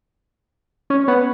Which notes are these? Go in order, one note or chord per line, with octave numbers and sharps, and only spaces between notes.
C#4
B3